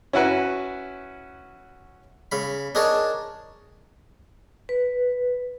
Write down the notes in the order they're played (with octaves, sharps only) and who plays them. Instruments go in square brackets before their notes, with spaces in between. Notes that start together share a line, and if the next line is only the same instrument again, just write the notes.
[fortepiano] C#4 E4 F#4 B4
[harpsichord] C#3 F5 B5
D4 D#4 G#4 A#4 C#5 A5
[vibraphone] B4